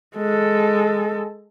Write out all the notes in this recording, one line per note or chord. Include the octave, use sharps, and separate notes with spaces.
G#3 A4